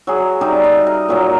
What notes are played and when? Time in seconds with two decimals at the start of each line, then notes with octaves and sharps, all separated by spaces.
0.07 F#3 G#4
0.41 G3 D#4 D5 E5
0.64 D#5
0.87 A#4
1.09 A#2 F#3 A#3